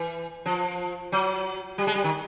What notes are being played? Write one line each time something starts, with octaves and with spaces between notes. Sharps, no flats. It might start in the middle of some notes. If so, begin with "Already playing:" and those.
Already playing: E3
F3
F#3
G3
G#3
G3
D#3